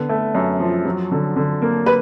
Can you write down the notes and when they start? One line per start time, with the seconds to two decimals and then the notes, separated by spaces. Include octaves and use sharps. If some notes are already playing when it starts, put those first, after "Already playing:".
Already playing: D3 B3
0.09 A3
0.35 F#2
0.60 F3
0.85 F#3
1.11 D3
1.36 D3
1.62 A#3
1.86 B4